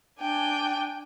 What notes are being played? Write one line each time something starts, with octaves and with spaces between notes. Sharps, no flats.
D4 G5 G#5